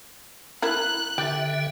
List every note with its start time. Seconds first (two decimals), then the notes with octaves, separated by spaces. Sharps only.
0.62 E4 A#4 F#6
1.18 D3 G4 E5